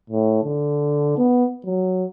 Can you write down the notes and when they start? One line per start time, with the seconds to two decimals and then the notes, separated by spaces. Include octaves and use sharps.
0.10 A2
0.44 D3
1.18 B3
1.65 F#3